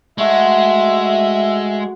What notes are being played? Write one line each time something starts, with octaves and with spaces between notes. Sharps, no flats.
G#3 A3 F#4 E5